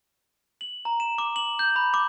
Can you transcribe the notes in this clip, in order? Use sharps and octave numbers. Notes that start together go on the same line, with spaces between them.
F#7
A#5
E7
D6
F#7
G6
B5
D6